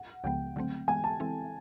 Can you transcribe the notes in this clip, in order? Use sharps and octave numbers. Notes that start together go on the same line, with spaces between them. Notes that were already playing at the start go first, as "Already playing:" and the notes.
Already playing: F#5
C#2 C#3 F3 G#3 B3 G5
D3 F#3 A3 C4
E3 G#3 B3 G#5
A5
E3 G#3 C4 E4 A4